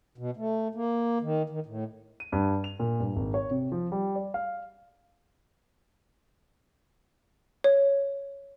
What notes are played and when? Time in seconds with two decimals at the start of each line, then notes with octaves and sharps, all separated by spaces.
0.18 B2
0.37 A3
0.75 A#3
1.21 D#3
1.50 D#3
1.66 A2
2.20 D#7
2.32 G2
2.64 F7
2.80 A#2
3.00 G2
3.16 G#1
3.34 C#5
3.51 C3
3.72 F3
3.92 G3
4.16 D5
4.34 F5
7.64 C#5